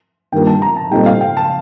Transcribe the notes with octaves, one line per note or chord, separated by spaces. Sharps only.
G2 D#3 A#3 F4 G5
A5
A#5
A5
A#2 G3 C4 D#4 A4 G5
F5
G5
A5